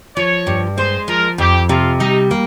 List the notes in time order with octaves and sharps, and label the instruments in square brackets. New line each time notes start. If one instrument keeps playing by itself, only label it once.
[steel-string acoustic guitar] F3 [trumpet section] C#5
[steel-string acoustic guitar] G2
[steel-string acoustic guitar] G#3 [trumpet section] C5
[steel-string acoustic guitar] F3 [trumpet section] A#4
[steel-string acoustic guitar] F2 [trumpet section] G4
[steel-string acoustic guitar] C3 [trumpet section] F4
[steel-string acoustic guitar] G3 [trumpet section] D#4
[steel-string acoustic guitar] A#3